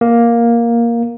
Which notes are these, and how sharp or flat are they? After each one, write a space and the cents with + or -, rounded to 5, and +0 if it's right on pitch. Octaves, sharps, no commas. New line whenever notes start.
A#3 +5